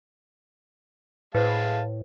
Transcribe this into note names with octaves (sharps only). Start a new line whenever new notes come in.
A2 G#3 B4 C5 F5 A5